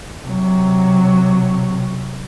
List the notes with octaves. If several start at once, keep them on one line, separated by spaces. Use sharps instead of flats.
C3 F#3